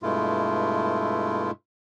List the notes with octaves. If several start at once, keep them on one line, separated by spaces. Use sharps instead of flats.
G2 B2 G#3 A3 E4 F4